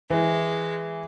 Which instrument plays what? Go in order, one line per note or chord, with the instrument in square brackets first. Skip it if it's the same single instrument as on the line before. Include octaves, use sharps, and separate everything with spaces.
[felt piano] E3 [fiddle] G#3